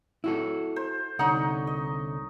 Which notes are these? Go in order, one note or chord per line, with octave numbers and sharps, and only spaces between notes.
E4 F#4 A4
C5
C2 D3 D#4 C#5 D#5 F#5
D#5